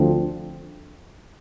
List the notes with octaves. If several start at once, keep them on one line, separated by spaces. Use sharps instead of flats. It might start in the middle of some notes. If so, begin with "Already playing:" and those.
Already playing: D2 D3 F3 C4